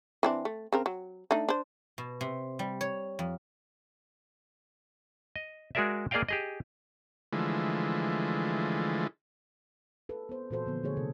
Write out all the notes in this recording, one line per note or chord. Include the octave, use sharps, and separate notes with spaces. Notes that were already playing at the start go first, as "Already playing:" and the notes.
E3 C4 D4
A3
C#3 C4 A#4
F#3
A3 D4 D#4
D4 C5
B2
C3
G3
C#5
F2
D#5
G#3 F#4 G#4 A#4 D5 E5
A#3 G#4 D5 D#5 F5 G5
G4 G#4 D#5
D3 E3 F3 G#3 A3
A4 B4
B3 C5
A#2 E3 F#4 A4 C5
D3 F3 B3
D3 A3 G#4 C#5
C3 A4